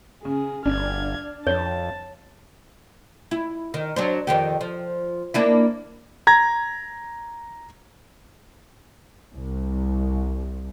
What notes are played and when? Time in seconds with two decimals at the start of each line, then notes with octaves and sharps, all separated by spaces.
0.25 C#3 G#4
0.66 G1 D4 F6 G#6
1.47 F2 C#5 A5
3.31 E4
3.74 D#3
3.96 F#3 D4 C5
4.27 F2 D#3 G4
4.61 F3
5.34 A#3 D4 E4
6.27 A#5 G#6 A#6
9.34 C2